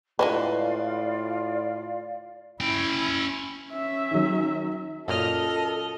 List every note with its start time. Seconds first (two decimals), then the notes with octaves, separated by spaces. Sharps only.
0.19 A2 D3 F#3 G#3 F4 B4 D5 F5
2.61 C#4 E4 G5
3.73 C#4 E5
4.11 D#3 F#3
5.08 F#2 A#2 A4 D#5 F6